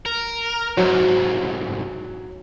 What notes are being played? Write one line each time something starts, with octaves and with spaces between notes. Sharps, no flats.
A#4
C2 G#2 F#3